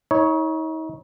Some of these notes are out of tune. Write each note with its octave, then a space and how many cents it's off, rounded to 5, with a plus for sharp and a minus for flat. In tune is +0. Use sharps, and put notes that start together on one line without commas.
D#4 +40 C#5 +0